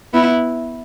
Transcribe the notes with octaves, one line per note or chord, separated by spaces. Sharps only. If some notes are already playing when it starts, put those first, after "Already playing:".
B3 E4